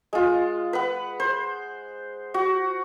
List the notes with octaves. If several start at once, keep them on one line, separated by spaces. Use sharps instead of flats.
G#3 F4
B4 F#5
C5
F#4